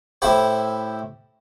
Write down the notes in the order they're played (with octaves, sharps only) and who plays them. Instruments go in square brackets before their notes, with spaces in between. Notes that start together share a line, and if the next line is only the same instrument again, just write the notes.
[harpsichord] A2 E4 G4 C5